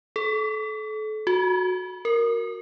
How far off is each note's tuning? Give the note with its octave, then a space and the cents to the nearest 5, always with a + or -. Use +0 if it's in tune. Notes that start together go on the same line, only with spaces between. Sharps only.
A4 -30
F#4 -15
A#4 -5